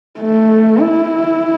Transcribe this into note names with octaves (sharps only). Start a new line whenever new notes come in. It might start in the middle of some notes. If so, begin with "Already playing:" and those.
A3
E4